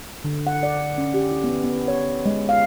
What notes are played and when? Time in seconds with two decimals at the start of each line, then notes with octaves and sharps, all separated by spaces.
0.24 D3
0.47 F#5
0.63 D5
0.98 C#4
1.14 G4
1.31 E4
1.44 B3
1.64 B3
1.88 C#5
2.26 G#3
2.49 F5